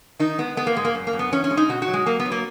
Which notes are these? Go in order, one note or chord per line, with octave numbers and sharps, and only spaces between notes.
D#3 D#4
G#3 B3
G#3 B3
A#3
G#2 G#3
A#3
F#2
A#3
F#2
B3
E3 C#4
C#4
G#3
D#4
B2 F#4
F#4
F#3
G#3
F#3 A#3
B3
F#3
A#3